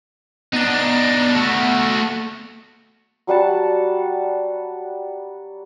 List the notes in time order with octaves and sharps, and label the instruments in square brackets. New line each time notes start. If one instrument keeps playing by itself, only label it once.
[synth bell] B3 A6 [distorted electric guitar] D4 D#4
[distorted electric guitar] A3 F#4
[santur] F#3 G3 F#5 A5